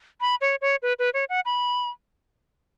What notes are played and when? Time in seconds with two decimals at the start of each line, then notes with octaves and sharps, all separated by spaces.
0.21 B5
0.41 C#5
0.61 C#5
0.82 B4
0.99 B4
1.14 C#5
1.29 F#5
1.45 B5